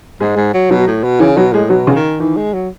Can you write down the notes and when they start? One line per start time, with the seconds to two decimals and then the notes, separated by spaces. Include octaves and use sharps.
0.20 G#2 G#3
0.37 G#2
0.54 F#3
0.71 B2 F#3
0.87 A2
1.04 B2
1.20 C#3 E3
1.37 B2 F#3
1.53 A2 G#3
1.70 B2 F#3
1.87 C#3
1.95 D#3
2.20 D#3 E3
2.37 G#3
2.54 F#3